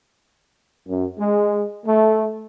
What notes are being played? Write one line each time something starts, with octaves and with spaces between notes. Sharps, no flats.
F#2
G#3
A3